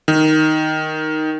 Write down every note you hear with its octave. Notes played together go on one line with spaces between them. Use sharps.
D#3